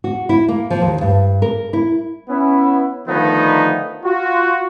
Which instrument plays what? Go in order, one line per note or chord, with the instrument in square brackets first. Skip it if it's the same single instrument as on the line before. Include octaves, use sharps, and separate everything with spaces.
[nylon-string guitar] F#4
E4
A#3
F3
D#2
G2
A#4
E4
[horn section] B3 C#4 E4
D3 D#3 F3 A3 B3 D#4
F4 F#4